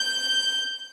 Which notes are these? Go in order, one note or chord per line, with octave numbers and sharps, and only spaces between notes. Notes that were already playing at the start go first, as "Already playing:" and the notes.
Already playing: G6